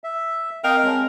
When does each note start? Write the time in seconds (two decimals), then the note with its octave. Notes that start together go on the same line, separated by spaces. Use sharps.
0.04 E5
0.64 C4 A#4 D#5 F5 G5
0.83 G#3 C4 C#5 A5